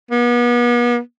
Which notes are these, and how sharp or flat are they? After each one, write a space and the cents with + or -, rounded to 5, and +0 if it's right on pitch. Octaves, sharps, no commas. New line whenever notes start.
B3 -40